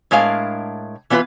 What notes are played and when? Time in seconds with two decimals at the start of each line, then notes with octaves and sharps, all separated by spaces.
0.11 A2 G#3 D4 A#4 F5
1.10 E3 B3 D4 F4 B4